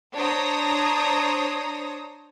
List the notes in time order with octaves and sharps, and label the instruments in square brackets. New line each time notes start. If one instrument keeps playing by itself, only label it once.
[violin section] D4 C5 C#5 A#5 D#6